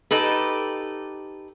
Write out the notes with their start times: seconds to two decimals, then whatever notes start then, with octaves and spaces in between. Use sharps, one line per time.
0.11 D#4 G4 A4 B4